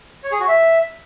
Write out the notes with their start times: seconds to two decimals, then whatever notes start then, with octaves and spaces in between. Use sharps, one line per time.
0.24 C#5
0.32 G#4
0.40 F#4
0.48 E5